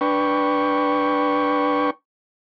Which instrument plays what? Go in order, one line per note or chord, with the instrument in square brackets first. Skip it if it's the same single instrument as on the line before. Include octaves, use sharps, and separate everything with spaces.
[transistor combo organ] D4 B4 G5 C#6